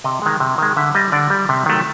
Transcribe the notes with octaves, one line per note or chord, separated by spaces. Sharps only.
C3 D#5
D#3 G#3
C3
D#3 G#3
D3 E5
G3 D#5
D3 D5
G3
C3
D#3 F#3 A3